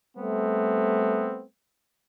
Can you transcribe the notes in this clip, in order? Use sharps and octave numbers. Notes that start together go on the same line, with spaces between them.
G3 A3 B3 C4